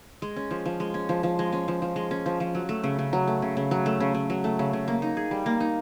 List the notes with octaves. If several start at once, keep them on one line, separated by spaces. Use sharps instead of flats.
G#3
C#4
F3
F3
G#3
C#4
F3
F3
G#3
C#4
F3
F3
G#3
C#4
F3
F3
F#3
A3
C#3
C#3
F#3
A3
C#3
C#3
F#3
A3
C#3
C#3
F#3
A3
C#3
C#3
A#3
D#4
G#4
G3
A#3
D#4